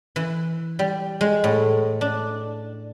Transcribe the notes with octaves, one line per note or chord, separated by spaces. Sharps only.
E3
G3
G#3
A2
D4